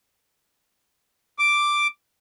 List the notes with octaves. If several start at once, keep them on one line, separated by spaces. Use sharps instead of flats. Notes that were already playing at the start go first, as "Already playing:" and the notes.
D6